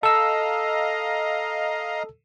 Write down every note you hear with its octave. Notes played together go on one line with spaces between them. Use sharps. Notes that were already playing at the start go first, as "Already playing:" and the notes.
A4 D#5 F5 A#5 E6